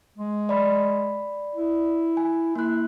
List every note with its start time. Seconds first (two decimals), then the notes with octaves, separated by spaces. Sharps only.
0.18 G#3
0.49 D5 B5
1.55 E4
2.17 G#5
2.56 A#3 E4 F#6